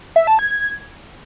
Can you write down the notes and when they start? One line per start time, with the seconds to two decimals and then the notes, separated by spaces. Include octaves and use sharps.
0.16 E5
0.27 A5
0.39 G#6